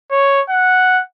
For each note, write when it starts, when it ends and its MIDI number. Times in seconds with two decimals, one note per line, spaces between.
0.11 0.41 73
0.49 1.01 78